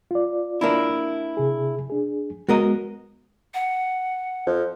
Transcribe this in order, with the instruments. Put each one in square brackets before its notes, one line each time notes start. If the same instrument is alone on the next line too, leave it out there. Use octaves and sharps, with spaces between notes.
[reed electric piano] F4 D5
[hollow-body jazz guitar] A#3 D4 E4
[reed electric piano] C3 G#4
D4 G#4
[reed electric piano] G#3 B3 [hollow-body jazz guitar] F#4 A#4 D#5
[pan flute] F#5
[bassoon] F2